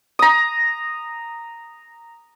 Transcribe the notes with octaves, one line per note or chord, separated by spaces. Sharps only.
A#5 D#6